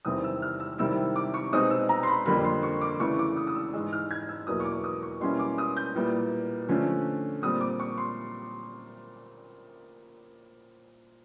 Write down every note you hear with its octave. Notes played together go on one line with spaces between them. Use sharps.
E2 C3 D#3 G3 C4 D#6
E6
F6
E6
C3 D#3 G3 C4 E4 E6
D6
C#6
B2 G#3 C4 D#4 D#6
E6
A#5
C6
B5
F2 D3 G3 A#3 B5
C6
C#6
D6
C#3 E3 A3 D4 C#6
D6
D#6
D#6
E6
G#2 E3 G#3 E6
F6
G#6
E6
E2 B2 F#3 A#3 D#6
C#6
D6
D#6
C#6
B2 G3 A#3 C#4 E4 C6
D6
D#6
G6
A#2 G3 B3 E4
D3 F3 A3 C#4
A#2 G3 C4 D#6
D6
C#6
C6